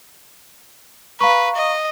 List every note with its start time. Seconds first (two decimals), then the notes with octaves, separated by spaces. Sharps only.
1.21 B4 F5 A#5 C#6
1.56 D#5